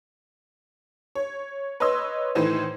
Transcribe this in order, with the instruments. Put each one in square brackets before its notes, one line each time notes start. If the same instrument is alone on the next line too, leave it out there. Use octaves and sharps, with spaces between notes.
[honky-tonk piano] C#5
B4 C#5 D#5 C6 E6
A2 D#3 E3 C5